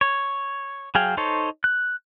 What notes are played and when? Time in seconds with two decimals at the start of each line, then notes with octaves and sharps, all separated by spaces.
0.01 C#5
0.95 F#3 G#4 F5 G5
1.17 D#4 A4 C5 C#5
1.64 F#6